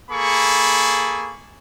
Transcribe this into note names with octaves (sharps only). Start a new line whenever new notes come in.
A#3 G#4 A4 B5 C#6